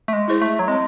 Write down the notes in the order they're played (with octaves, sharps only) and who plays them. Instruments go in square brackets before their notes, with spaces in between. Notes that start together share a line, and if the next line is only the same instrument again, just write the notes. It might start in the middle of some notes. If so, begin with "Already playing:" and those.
[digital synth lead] A3
G#3
[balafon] E4 G#4 C5
[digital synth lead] A3
F#3
[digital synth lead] G#3 [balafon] C4